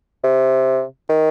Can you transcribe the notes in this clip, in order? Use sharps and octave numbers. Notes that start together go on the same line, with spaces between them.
C3
D#3